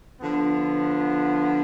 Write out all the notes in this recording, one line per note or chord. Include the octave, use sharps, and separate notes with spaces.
D3 F3 B3